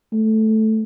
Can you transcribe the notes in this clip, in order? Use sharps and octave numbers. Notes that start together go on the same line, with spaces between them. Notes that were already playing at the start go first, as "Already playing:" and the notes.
A3